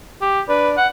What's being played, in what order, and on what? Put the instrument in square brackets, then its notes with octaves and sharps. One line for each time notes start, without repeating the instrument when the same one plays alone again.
[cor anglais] G4
[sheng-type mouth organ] D4 D5 [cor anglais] B4
[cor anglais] F#5